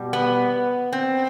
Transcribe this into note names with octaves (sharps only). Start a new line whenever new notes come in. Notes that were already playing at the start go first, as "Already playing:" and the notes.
Already playing: B2 G3
B3
C4